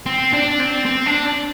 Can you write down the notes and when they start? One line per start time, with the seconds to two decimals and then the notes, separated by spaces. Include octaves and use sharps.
0.06 C4
0.33 D4
0.60 C4
0.85 C4
1.07 D4